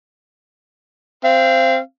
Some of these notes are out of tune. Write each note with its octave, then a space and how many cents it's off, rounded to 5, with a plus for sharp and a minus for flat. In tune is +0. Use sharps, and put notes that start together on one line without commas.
C4 +0 F5 -30